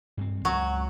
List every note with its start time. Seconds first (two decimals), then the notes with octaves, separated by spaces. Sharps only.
0.17 G2 C4
0.45 C#2 F#3